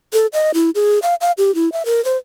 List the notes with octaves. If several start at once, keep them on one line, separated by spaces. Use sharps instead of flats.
A4
D#5
E4
G#4
F5
F5
G4
E4
E5
A#4
C5